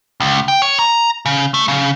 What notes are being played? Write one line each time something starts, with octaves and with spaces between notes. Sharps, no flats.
C#2
G5
C#5
A#5
C#3
A3
C#3